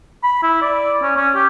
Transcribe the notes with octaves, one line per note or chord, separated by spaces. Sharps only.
B5
E4
D5
C#4
C#4
G4